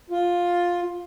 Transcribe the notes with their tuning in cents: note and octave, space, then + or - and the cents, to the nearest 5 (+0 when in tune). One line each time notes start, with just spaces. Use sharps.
F4 +10